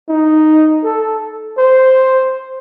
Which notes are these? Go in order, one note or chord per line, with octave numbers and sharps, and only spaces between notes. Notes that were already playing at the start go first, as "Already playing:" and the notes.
D#4
A4
C5